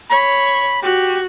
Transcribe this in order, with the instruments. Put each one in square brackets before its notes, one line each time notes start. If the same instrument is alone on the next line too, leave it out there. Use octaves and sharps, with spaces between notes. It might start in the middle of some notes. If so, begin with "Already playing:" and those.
[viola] C#5 [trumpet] B5
[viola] F#4 [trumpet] G4